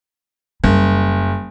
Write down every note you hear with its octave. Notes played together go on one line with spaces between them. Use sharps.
F#1 G3